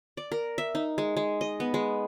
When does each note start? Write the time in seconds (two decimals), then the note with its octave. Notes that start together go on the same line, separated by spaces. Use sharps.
0.17 D5
0.32 A#4
0.58 E5
0.75 D#4
0.98 G#3
1.17 G#3
1.41 D#5
1.60 B3
1.74 G#3